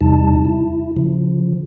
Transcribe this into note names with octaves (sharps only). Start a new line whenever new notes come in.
E2 C3 G3 D#4 A5
E4
C#3 F3